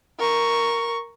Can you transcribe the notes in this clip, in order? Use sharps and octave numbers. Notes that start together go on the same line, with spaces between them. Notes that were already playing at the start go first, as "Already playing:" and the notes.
A#4 C#6